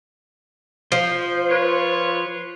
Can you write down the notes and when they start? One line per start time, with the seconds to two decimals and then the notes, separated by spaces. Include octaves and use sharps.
0.92 F3 C5
1.49 F4 B4 C#5